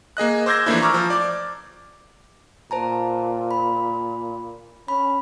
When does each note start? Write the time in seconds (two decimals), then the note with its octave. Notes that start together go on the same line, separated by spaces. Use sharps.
0.17 A#3 G#4 D#5 F#6
0.46 C5 D6 E6 G6 G#6 A#6
0.66 E3 F3 A3 A#3 D4 E4
0.82 A#5 C#6 D6 E6 F6
0.94 F3
1.10 D5 D6
2.71 A#2 C5 A5 A#5
3.51 B5
4.88 C#4 B5